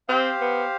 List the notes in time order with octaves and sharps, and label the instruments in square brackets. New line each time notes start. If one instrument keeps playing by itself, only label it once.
[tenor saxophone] C4 [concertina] G4 C5 F5
[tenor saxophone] B3